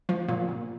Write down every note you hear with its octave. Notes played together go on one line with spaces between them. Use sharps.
F3
A#2
A#2